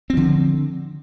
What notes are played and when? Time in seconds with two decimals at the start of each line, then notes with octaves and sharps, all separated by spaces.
0.10 C4
0.13 F3
0.17 D3